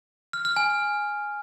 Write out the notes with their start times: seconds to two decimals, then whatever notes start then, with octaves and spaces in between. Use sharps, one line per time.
0.33 F6
0.45 F6
0.56 G#5